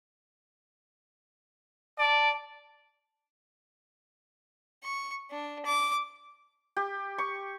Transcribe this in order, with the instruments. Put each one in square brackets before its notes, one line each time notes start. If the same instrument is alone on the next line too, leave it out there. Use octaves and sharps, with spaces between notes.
[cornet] D5 [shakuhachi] A5
[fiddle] C#6
D4
D6
[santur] G4
C#6